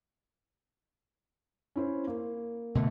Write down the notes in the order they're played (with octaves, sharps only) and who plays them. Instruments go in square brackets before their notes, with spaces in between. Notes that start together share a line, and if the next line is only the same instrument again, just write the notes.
[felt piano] C#4 E4 C5
A#3
[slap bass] B2 D3 A3